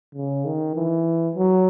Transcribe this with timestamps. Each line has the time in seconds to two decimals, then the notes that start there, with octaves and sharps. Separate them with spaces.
0.15 C#3
0.45 D#3
0.76 E3
1.35 F#3